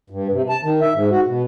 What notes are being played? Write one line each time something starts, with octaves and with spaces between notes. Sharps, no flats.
G2
C3
A5
D#3
E5
G#2
F#4
B2